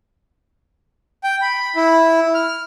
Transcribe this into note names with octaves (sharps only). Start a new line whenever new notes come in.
G5
B5
E4
F6